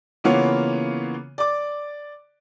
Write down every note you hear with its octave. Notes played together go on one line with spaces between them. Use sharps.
C#3 E3 A#3 B3 F4 C#5
D5 D6